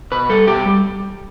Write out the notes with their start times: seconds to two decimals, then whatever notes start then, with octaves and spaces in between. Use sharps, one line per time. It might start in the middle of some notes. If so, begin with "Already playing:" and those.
0.12 B2 B4
0.29 G3 A4
0.47 B2 G4
0.66 G3